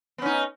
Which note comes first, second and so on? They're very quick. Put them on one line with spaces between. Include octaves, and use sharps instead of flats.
B3 C#4 D#4